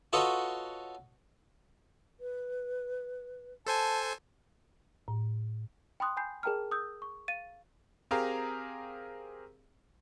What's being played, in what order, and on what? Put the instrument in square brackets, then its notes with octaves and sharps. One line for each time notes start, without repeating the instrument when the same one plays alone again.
[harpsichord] F4 F#4 A4 B4 C#5 D#5
[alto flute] B4
[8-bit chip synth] A4 C5 G#5 [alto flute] A5
[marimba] A2
[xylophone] G5 B5 C6 D#6 F#6
G5 G#5 B5 G6 C7
G#4 A#4 G5 A5 A#5 F6
D#6 E6 G6
C#6
F5 A6 D#7
[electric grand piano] C4 G4 G#4 A#4 F5 A#5